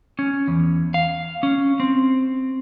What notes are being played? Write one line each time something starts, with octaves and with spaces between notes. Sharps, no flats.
C#4
E2
F5
C#4
C4